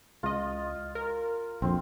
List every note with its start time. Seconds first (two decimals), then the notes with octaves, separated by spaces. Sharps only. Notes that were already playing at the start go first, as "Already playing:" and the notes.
0.23 C#2 F4 D#5
0.95 A#4
1.62 A#1 F2 C4